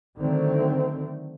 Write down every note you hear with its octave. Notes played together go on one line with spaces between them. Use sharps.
D3 D#3 F#3 A3 C4